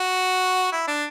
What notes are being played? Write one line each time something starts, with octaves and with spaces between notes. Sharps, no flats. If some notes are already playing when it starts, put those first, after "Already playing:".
Already playing: F#4
E4
D4